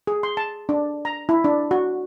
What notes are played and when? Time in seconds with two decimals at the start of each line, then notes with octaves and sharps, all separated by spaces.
0.07 G#4
0.23 C6
0.37 A5
0.69 D4
1.05 A#5
1.29 E4
1.44 D4
1.71 F#4